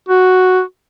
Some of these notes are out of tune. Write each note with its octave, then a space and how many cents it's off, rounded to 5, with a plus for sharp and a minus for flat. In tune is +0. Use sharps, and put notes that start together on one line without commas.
F#4 +0